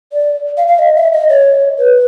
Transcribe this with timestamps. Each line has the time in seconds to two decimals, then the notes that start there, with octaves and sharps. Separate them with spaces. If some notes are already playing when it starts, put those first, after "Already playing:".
0.13 D5
0.57 F5
0.68 F5
0.79 D#5
0.96 E5
1.13 D#5
1.29 C#5
1.79 B4